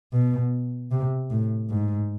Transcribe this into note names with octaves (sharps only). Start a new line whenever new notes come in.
B2
C3
A2
G#2